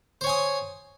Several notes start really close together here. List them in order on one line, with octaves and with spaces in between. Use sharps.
C5 C#5 G#5 D#6